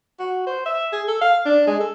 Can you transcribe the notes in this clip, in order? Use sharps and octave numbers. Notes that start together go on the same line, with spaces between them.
F#4
C5
E5
G#4
A4
F5
D4
G#3
A4